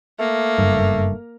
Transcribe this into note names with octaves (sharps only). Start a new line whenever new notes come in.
A3 A#3
F#1 G2